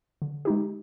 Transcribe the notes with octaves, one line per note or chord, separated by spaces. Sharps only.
D3
G#3 D#4 G4